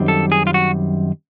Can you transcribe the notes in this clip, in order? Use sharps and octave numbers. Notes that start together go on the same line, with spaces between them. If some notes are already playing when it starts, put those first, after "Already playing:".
Already playing: F#2 D#3 G3 C4
A4
G#4
F4
F#4